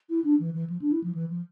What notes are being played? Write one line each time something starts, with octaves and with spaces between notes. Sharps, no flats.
E4
D4
E3
E3
F3
D4
E4
F3
E3
F3